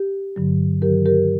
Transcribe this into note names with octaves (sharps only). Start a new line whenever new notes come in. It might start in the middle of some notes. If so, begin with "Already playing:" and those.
Already playing: G4
G2 D3 F#3
G2 D#3 F#3 G4 A#4
G4 A#4